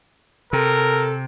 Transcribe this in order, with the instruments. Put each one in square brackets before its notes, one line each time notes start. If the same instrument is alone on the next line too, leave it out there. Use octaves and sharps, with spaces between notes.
[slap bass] C3 [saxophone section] A4 [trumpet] A#4